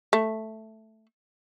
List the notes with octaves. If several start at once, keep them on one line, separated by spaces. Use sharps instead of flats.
A3